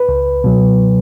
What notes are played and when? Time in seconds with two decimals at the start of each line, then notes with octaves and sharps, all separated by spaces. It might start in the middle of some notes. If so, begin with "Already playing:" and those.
Already playing: B4
0.09 C#2
0.44 B2 F#3